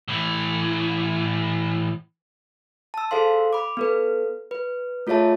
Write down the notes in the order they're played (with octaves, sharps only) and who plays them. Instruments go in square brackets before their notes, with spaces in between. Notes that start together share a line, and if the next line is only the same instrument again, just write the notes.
[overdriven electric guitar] A2 E3
[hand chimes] A5 E6
G#4 A4 C5 F5 C6
B5 D6
B3 A4 B4
B4
A3 F4 G#4 C#5 E5 A5